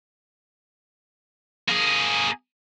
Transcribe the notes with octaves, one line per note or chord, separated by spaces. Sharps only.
A#3 G#4